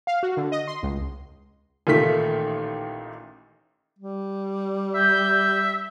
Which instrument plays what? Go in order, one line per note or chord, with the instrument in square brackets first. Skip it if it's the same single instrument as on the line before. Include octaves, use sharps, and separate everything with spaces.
[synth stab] F5
F#4
D3
D#5
C6
C#2
[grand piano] A1 A#2 D#3 A3 B6
[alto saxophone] G3
[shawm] E5 [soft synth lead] G6